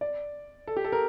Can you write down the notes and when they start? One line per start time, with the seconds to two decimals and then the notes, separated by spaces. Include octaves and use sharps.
0.01 D5
0.67 A4
0.77 G4
0.84 A4
0.92 A#4